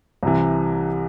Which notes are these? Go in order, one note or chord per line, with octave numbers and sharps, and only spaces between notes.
C2 C3 E3